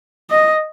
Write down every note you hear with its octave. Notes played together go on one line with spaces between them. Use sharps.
D#5